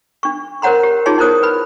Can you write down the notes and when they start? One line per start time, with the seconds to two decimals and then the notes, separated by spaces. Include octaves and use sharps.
0.23 D4 C#6
0.62 A#4 C5 C#5 F#5 A#5 C6
0.83 G4
1.06 D#4 F4 G#4 C#5 A5 C6
1.18 D#4 E4 A#4 C5 D#6
1.43 B4 B5